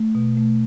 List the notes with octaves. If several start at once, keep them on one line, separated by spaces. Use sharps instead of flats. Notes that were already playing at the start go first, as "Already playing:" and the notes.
Already playing: A3
B2
A3